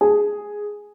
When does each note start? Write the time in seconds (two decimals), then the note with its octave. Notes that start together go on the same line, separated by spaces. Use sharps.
0.01 G#4